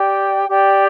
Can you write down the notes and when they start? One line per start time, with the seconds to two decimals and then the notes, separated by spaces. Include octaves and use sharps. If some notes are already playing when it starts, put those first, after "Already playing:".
Already playing: G4 D5 G5
0.49 G4 D5 G5